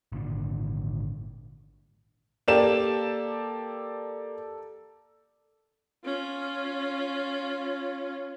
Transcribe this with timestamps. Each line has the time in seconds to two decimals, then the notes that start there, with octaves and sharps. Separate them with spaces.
0.12 G#1 A#2 D3
2.48 A#3 G4 A4 D5 E7
6.05 C#4 F4